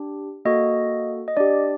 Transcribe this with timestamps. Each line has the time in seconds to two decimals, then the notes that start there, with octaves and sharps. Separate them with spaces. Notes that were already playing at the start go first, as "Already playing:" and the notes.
Already playing: D4 G4
0.45 A#3 F#4 A4 D#5
1.28 D#5
1.37 D4 G4 D5